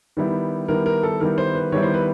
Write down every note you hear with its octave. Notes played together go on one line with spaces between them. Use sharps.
D#3 G3 B3 E4
D#3 G3 B3 E4 A#4
A#4
A4
D#3 G3 B3 E4 A#4
C5
B4
D#3 G3 B3 E4 C#5
C5
B4